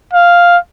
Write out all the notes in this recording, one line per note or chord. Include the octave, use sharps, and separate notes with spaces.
F5